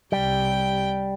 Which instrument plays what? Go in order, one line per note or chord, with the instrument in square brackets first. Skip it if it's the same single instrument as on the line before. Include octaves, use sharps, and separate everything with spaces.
[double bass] C2 C3 [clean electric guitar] G3 [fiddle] G5